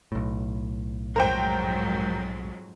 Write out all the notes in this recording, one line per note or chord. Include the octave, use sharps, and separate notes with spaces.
B1 A2
F2 G#2 F#3 A#4 C5 G5